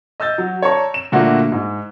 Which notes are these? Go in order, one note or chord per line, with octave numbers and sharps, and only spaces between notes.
D#5 E6 G6 A6
F#3
C#5 D5 A5 A#5 C#6
E7
A#2 D3 A3 A#3 D4 F#4
G#2